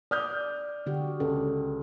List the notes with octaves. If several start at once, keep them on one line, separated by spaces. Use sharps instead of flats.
D5 D#6 F6 G6
D3 F#4 G4
C#2 A4